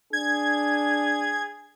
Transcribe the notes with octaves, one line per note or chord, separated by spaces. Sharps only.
D4 G#4 G#6